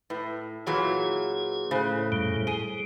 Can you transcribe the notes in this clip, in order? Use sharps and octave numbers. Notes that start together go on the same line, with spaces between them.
A2 B4
A#2 E3 F#3 G#4
A2 C#3 C5 B5 F#6
F#2 A#2 G3
G3 G#4 D#7